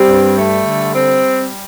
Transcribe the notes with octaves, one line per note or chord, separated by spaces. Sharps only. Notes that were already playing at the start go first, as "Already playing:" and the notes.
Already playing: G3 C4
G2
A3
D3
C4